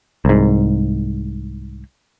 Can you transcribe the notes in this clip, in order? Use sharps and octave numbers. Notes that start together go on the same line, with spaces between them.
C2 G#2